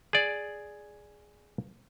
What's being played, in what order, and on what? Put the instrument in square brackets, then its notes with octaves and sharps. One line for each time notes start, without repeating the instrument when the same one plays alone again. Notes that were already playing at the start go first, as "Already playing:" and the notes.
[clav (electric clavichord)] G#4 D5